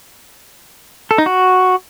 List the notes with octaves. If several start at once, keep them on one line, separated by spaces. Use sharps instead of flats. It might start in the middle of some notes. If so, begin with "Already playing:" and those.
A4
D#4
F#4